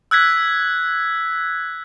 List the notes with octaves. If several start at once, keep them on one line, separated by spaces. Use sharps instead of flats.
E6 F#6 G#6 B6